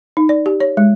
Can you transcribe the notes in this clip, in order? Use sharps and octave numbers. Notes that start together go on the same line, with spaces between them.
D#4
D5
G4
C#5
G#3